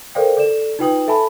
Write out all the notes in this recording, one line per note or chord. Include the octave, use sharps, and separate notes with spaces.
A4 A#4 C5 D5 F5 G5
A4 D5 E7
D#4 F4 B4 G5 D#6 F#7
A4 E5 G#5 A5 B5